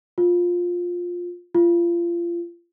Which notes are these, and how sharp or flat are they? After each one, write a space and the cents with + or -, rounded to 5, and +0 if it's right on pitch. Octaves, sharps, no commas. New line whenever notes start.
F4 +15
F4 -30